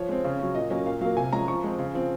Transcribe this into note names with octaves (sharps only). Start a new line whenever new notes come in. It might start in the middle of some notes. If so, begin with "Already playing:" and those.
Already playing: F3 C#5
G#3 C4
C#3
F#3 C#4
A#2 D#5
F#3 A#3 C#4
A#2 F5
F#3 A#3 F5
C3 G#5
F3 G#3 C#4 A#5
F3 C#6
G#3 C4
C#3
F3 C4